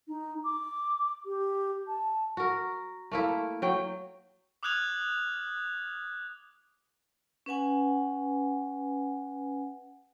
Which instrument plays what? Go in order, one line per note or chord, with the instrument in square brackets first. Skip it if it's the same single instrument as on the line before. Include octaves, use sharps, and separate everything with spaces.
[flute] D#4
D6
G4
A5
[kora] F#4 A#4
A3 A#3 E4
F#3 G5
[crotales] D6 D#6 F6 F#6 G#6 F7
[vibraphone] C#4 B4 F#5 G#5